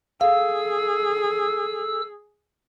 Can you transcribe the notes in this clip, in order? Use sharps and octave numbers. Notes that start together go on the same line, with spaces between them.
G#4 A4 F5 E6